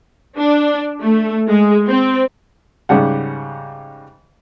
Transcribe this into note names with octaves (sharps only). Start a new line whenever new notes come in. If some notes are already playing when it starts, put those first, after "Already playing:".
D4
A3
G#3
C4
G#2 C#3 G3 F#5